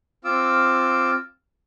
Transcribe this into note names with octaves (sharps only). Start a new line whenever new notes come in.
C4 F4 D6 E6